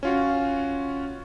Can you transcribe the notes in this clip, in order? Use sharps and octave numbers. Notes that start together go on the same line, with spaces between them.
C#4 F4 F#4